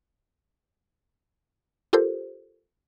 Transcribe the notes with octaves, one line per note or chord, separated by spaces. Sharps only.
F4 G4 A4 A#4 C5